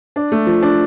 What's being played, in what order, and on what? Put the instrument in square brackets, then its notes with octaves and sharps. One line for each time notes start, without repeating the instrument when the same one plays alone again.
[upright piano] D4
A3
F3
D4